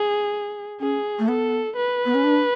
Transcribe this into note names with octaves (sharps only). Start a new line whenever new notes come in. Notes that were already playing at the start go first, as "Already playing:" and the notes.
Already playing: G#4
C#4 G#4
A3
B3 A4
B4
B3
C#4
D4